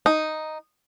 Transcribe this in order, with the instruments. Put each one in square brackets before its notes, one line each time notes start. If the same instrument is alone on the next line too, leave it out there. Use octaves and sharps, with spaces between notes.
[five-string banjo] D#4